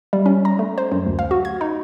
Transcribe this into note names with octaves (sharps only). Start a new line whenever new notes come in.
G3
C#4
A#5
A3
C5
F#2
D2
F5
F#4
G#6
D#4